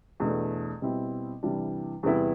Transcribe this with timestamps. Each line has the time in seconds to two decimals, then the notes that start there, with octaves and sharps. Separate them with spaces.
0.20 E2 B2 A3 D4
0.82 B2 G3 C4 E4
1.43 C3 E3 G3 D4
2.03 E2 C3 G3 B3 E4